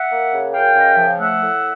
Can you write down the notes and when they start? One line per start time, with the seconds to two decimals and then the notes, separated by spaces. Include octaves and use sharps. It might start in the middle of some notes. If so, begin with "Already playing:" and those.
Already playing: E5 F#5
0.10 A#3
0.32 C#3
0.54 F#2 F5 G5
0.76 C#3 D#5
0.92 E5
0.98 F3
1.06 F5
1.19 A3 E5 F#5
1.41 A2